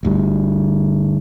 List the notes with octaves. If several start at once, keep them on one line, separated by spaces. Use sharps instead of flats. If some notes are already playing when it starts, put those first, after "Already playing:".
G1 D2 G3